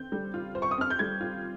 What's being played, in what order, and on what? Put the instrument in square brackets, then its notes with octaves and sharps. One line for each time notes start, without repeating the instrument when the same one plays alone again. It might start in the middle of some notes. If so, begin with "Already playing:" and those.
Already playing: [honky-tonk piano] C4 [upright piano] G6
[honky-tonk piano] G3
F4
C5
[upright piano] C#6
D#6
[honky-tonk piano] C4 [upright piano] F6
[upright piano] G6
[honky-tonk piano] G3 [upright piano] G#6
[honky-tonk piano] F4